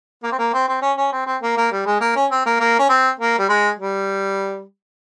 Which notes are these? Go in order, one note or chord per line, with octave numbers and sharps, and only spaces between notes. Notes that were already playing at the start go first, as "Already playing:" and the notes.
A#3
C4
A#3
C4
C4
C#4
C#4
C4
C4
A#3
A#3
G3
G#3
A#3
C#4
C4
A#3
A#3
C#4
C4
A#3
G3
G#3
G3